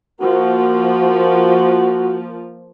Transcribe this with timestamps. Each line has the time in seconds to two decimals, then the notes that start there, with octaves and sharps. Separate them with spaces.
0.21 F3 A#3 F#4